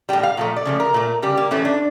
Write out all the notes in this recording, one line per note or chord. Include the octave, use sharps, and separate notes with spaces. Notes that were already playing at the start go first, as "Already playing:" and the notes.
A2 E3 G3 G5
F5
A#2 F3 A3
D5
C#3 F3 A3
A#4
A#2 A3
C#3 G3 G4
A#3
A2 E3 A3 C#4
D4